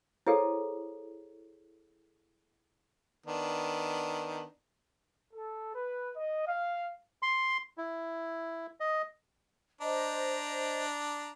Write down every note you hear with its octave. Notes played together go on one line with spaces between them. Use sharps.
E4 G#4 A4 C5 C#5 F5
D#3 B3 D4
A4
B4
D#5
F5
C6
E4
D#5
D4 C5 D#5 A#5